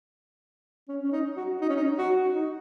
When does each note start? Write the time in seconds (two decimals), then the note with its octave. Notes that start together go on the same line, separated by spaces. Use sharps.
0.89 C#4
1.04 C#4
1.12 D#4
1.37 F#4
1.61 D#4
1.69 C#4
1.76 D#4
1.98 F#4
2.35 D#4